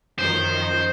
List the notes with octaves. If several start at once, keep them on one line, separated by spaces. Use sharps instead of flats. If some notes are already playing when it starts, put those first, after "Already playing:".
F#2 D#3 F3 C5